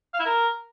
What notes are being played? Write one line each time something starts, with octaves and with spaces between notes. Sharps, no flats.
F5
E4
A#4